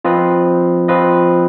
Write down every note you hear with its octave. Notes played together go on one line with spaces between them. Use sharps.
F3 C4 F4 B4 D#5
F3 C4 F4 B4 D#5